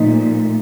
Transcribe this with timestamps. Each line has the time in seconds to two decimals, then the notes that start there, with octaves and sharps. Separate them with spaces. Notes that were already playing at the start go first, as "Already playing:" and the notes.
Already playing: A#2 F3 A3 D#4